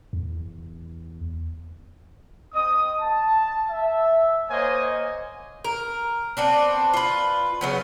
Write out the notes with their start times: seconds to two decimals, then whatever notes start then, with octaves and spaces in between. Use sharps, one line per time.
0.13 E2
2.53 C4 D#5 D#6
2.98 A5
3.70 E5
4.50 A#3 C5 C#5 D#5 G#5
5.64 A#4
6.37 B3 C4 D4
6.93 F4 B4
7.61 C#3 F#3 B3